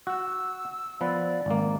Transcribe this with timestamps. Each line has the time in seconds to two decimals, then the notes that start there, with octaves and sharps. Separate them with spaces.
0.07 F#4 F#5 E6
1.01 F3 B3 B4 D5
1.46 G#1 A#3